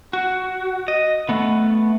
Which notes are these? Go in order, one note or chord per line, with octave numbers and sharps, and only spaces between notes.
F#4
D#5
A3 B3